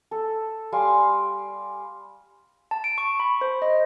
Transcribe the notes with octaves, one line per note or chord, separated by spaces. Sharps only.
A4
G3 F5 G#5 C6
A5
D7
C#6
B5
C5
D#5